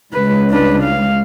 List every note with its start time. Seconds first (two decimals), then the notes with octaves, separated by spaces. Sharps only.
0.13 C#2 B4
0.50 D4 B4
0.84 F5